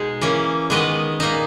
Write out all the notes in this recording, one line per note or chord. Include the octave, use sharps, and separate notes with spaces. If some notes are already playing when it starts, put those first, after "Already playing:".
Already playing: B2 G#3 D#4 G#4
E3 A#3 C#4
D#3 G#3 B3 B4 D#5
A#2 A#3 D#4